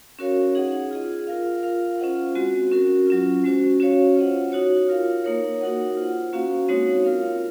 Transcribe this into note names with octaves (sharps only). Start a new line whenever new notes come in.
C#4 F#4 A#4 C#5 F5
D#4 G#4 D#5 F#5
F4 G#4 D#5
F4 A#4 F5
F4 A#4 F5
C#4 F4 C5 D#5 F#5
G#3 C4 F#4
C#4 F#4 A#4
F#3 C#4 F4
G#3 C#4 F#4 C5
C#4 F#4 C#5 F5
F4 C5 D#5 F#5
D#4 F#4 C#5
F4 A#4 F5
A#3 D#4 A#4 C#5
D#4 F#4 A#4 D#5 F#5
F4 C5 F#5
A#3 C#4 F#4 C5 F5
G#3 C4 D#4 F#4 C#5
F4 A#4 F5